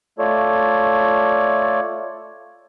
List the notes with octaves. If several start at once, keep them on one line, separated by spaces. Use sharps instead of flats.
A3 F4 A4 C#5 D5